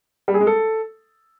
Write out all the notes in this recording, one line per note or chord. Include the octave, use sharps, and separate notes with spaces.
G3
G#4
G#3
A4